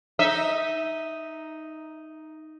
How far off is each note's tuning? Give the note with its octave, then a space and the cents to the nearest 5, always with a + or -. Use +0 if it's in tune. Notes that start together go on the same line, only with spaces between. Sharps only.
D#4 +0 E5 -15